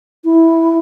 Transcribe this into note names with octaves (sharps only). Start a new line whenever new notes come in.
E4